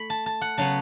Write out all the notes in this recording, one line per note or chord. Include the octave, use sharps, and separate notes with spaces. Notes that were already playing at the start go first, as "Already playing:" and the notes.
Already playing: A3 B5
A5
A5
F#5
C#3 F#3 B3 A5